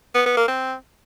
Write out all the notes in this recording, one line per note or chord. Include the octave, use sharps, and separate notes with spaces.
B3
B3
A#3
C4